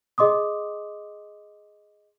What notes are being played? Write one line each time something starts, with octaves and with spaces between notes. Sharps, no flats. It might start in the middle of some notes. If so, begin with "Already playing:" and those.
G#4 D#5 C6 D6 D#6